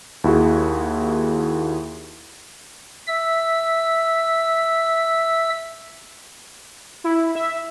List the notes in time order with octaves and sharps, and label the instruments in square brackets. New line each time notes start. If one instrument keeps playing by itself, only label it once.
[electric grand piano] D#2 E4 F#4 G#4
[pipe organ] E5 E6
[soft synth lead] E4
E5